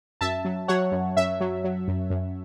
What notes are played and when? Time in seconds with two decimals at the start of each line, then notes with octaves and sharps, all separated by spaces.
0.21 F#2 E5 A5
0.45 F#3
0.68 F#3 C#5 F#5
0.92 F#2
1.16 F#2 E5
1.40 F#3
1.64 F#3
1.88 F#2
2.10 F#2